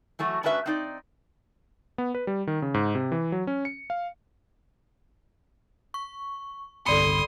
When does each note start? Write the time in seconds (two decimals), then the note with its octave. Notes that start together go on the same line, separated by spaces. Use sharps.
0.19 E3 F#3 A3 F#4
0.43 G#2 C#4 D4 F#4 B4 E5
0.66 C4 D#4 D5
1.98 B3
2.15 B4
2.27 G3
2.47 D#3
2.62 C#3
2.74 G#2
2.95 C3
3.12 E3
3.32 F#3
3.47 C#4
3.65 C#7
3.90 F5
5.94 C#6
6.86 G1 C2 A4 D5 B5 C6 D#6 C#7